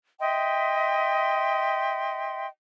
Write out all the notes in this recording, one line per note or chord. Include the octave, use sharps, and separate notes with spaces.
D#5 E5 G5 C6